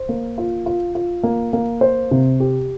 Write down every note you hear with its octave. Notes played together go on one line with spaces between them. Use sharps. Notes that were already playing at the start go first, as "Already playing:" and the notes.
Already playing: C5
A#3
F4
F4
F4
A#3
A#3
C5
C3
G4